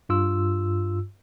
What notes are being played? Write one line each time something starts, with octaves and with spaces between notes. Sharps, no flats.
G2 F4 E6